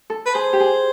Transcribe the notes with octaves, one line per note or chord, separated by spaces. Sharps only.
A4
B4
G#4 C5
G4
G#4